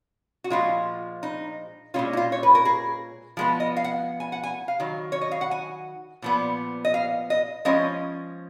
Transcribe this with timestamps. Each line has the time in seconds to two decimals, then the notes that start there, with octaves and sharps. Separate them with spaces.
0.44 F#4
0.50 A#2 F3 G#3 F4
1.23 D#4
1.94 A#2 G#3 C#4 F4
2.13 D#4
2.17 F4
2.32 C#5
2.43 B4
2.55 A#4
2.65 G#4
3.37 F3 G#3 B3
3.60 D#5
3.77 F5
3.84 F#5
4.20 G#5
4.32 F#5
4.43 G#5
4.68 F5
4.80 D#3 F#3
5.12 C#5
5.21 D#5
5.31 F5
5.41 F#5
5.51 G#5
6.22 A#2 F3 B3
6.85 D#5
6.94 F5
7.30 D#5
7.65 F3 G#3 C#4 D#5